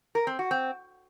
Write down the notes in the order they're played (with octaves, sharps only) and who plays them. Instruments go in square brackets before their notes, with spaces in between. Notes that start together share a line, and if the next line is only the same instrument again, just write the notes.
[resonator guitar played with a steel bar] A#4
C4
F#4
C4